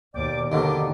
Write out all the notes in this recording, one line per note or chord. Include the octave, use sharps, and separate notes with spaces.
D#2 B2 D5 G5 D6
D#2 B2 D3 D#3 F3 D#4 D6